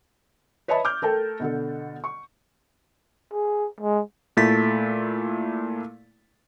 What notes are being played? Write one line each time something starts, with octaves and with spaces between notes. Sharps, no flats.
B4 C#5 D#5 E5 A5 B5
D6 F6 G6
A3 A4 A#4 G5 A5
B2 D3 A4
C#6
G#4
G#3
A#2 A3 E4 A6 B6